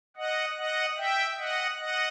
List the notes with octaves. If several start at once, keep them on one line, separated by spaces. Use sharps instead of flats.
D#5 F#5
D#5 F#5
E5 G5
D#5 F#5
D#5 F#5